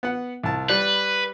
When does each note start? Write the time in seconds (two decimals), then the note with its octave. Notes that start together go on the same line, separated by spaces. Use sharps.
0.03 B3 F#5
0.43 C2 A5
0.69 G3 B4